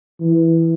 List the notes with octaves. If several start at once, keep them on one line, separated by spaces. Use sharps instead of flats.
E3